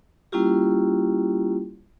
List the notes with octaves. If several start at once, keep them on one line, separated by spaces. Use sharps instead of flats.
G3 A#3 C#4 E4 F4 G4